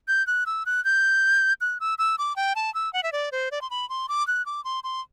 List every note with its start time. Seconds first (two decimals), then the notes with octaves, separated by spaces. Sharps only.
0.08 G6
0.27 F#6
0.46 E6
0.66 F#6
0.85 G6
1.61 F#6
1.80 E6
1.98 E6
2.18 D6
2.36 G5
2.56 A5
2.74 E6
2.93 F#5
3.03 E5
3.12 D5
3.32 C5
3.51 D5
3.62 C6
3.71 B5
3.89 C6
4.09 D6
4.28 F#6
4.46 D6
4.64 C6
4.84 C6